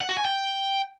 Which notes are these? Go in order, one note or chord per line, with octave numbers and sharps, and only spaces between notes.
F#5
F#4
G#5
G5